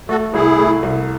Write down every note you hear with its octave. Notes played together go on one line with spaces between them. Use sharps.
A3 F#4 A4
C2 E4 G#4
A3
C2